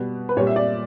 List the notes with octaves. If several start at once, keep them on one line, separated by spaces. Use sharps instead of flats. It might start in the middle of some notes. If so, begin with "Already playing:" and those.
Already playing: B2 G3 B4
B4
A#2 G3 C#5
E5
D5